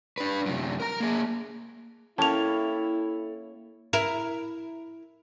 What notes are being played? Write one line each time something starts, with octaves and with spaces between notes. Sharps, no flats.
D4 B4
F#2 C3
A#4 A#5
A#3 G#4
A#3 C#4 E4 A4 G5 A5 F7
E4 A#4